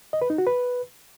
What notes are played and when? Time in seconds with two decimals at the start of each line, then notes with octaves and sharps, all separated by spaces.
0.13 D#5
0.22 B4
0.30 D#4
0.38 F#4
0.47 B4